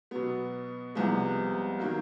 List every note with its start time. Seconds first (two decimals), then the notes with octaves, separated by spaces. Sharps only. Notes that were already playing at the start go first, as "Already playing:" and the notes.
0.11 B2 F#3 B3
0.95 C2 C3 F3 G#3 B3
1.79 D#3 F#3 A#3